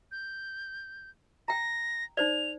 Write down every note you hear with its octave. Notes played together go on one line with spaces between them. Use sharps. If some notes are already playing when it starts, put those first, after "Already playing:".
G6
G5 A#5 A#6
D#4 C5 D5 F7